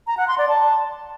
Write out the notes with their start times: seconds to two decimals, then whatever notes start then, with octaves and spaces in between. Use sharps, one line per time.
0.07 A#5
0.17 F#5
0.28 C6
0.38 D5
0.48 A5